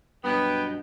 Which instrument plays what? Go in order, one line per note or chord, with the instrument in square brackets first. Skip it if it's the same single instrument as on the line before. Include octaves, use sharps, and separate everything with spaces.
[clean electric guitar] G2 B2 F#3 [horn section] B3 [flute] G5